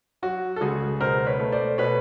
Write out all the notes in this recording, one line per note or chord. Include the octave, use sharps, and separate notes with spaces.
F#3 F#4
A4
C#2 F#4 G#4
B2 A#4 C5
B4 C#5
A3
C5 D5
B2 B4 C#5